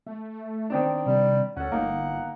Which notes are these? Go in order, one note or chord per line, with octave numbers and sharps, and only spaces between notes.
A3
D#3 C4 D4
C3 G3
D2 C#4 A4 F#5
G1 A#3 D#4